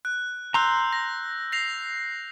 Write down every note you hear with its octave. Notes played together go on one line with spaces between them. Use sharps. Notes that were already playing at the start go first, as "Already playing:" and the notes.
F#6
A#5 C6 E6 F#6 G6
A#6
A#6 C7 F7